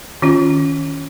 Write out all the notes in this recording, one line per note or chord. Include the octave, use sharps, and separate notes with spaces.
D#3 C#4 F4